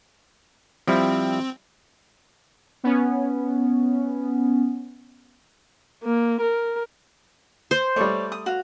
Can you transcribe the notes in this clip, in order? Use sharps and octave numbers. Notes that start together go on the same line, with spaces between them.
F3 G3 C4 E4
B3 C#4
A#3
A#4
C5
G3 A3 C#5 D5
D#6
F#4 F5